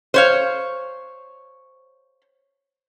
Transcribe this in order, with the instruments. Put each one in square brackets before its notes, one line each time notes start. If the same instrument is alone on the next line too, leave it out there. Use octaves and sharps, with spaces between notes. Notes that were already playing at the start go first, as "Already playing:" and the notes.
[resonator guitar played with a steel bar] C5 C#5 F5